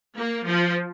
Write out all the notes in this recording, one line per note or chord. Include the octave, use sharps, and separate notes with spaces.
A#3
F3